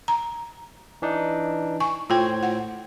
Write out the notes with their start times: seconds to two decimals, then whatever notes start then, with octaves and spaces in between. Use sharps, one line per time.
0.08 A#5
1.02 E3 D4 D#4
1.80 G#5 C#6
2.10 A2 F4 C5 G5 G#6
2.43 F#5